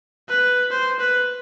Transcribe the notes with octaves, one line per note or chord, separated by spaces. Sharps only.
B4
C5
B4